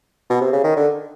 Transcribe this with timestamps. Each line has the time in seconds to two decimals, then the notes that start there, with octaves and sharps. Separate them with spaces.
0.30 B2
0.41 C3
0.53 C#3
0.64 D#3
0.76 D3